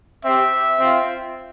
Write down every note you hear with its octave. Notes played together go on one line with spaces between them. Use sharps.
C4 G4 E5
C4 F4